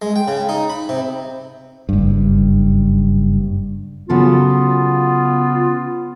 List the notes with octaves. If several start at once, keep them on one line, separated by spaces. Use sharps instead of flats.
G#3
G5
C#3
D#4
B5
C3
F#1 G2
C#3 F#3 B3 F4 A4